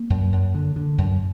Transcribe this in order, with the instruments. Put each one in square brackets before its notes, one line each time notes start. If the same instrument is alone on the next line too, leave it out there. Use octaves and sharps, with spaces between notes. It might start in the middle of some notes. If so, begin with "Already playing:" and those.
Already playing: [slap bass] A#3
F#2
F#2
D3
D3
F#2